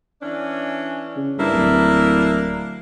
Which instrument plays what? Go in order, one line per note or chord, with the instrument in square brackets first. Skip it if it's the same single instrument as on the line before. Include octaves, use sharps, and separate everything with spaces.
[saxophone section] E3 C#4 D4
[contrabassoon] C#3
[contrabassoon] G2 [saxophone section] A#3 D4 E4
[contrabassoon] D1